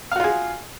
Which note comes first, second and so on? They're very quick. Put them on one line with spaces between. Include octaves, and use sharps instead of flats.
F5 F#4 F4 G#4